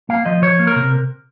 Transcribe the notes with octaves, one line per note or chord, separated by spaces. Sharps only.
A#3 F5
F3 D#5
F3 C#5
A#3
A#4
C3